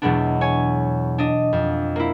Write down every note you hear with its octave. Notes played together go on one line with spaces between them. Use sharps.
E2 B2 F#3 G#3 B3 D4
C#5 G#5
D4 D#5
F2
A#3 E4